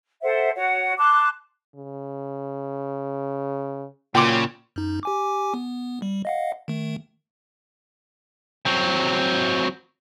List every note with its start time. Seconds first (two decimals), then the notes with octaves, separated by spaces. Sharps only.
0.23 A4 C5 E5 F#5
0.55 F#4 C#5 F#5
0.97 A5 C6 D6 F#6
1.75 C#3
4.15 A#2 C#3 F#3 G5 C6 D6
4.76 F#2 D#4
5.03 G4 G#5 D6
5.54 B3
6.02 G3
6.25 D#5 F5 F#5
6.68 D#3 A3
8.66 F#3 C4